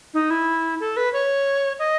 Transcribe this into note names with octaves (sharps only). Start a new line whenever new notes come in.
D#4
E4
A4
B4
C#5
D#5